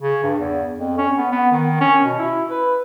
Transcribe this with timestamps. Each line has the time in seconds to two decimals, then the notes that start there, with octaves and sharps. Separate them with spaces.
0.01 C#3
0.24 G2
0.39 E2
0.78 F2
0.98 C#4
1.18 B3
1.32 B3
1.52 D#3
1.80 C#4
2.04 B2
2.19 E4
2.50 B4